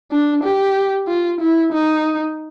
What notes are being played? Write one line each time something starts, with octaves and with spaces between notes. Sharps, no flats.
D4
G4
F4
E4
D#4